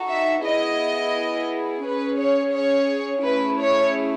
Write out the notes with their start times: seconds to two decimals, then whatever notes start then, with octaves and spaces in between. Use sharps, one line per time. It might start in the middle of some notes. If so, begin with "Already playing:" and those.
Already playing: D#4 F#4 A4
0.09 E5
0.44 B3 E4 G#4 D#5
1.84 C#4 G#4 B4
2.18 C#5
2.53 C#5
3.24 A3 C#4 E4 G#4 B4
3.59 C#5